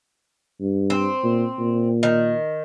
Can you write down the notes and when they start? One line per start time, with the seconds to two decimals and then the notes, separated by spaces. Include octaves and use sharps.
0.61 G2
0.90 C4
1.24 A#2
1.59 A#2
2.03 D#3